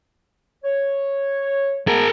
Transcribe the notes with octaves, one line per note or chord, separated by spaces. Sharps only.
C#5
G#3 A3 B3 G#4 A#4